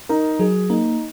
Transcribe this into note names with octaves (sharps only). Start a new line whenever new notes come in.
D#4 A#4
F#3 G#4
A#3 D#4